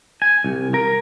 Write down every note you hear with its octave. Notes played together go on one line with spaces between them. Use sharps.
G#5
C2
A#4